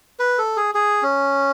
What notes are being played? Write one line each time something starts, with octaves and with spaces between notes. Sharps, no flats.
B4
A4
G#4
G#4
C#4